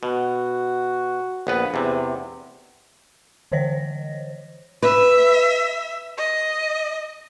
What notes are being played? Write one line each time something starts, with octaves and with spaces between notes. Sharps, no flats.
B2 F#4
A#1 B3 B4
E2 C3
D3 E3 C5 C#5 D#5 A#6
B4 E5
D#5